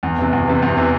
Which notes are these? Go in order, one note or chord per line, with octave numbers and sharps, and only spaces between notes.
E2
C3 E3
E2
C3 E3
E2
C3 E3